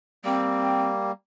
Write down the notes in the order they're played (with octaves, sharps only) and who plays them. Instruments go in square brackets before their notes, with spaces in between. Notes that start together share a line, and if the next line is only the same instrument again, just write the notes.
[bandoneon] G3 A#3 [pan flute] C4